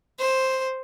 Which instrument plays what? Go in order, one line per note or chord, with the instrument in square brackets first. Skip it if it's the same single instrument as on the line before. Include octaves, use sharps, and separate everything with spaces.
[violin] C5